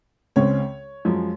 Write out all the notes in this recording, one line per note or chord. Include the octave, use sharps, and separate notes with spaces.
C#2 C#3 G#3 C4 C#5
F#2 F3 G#3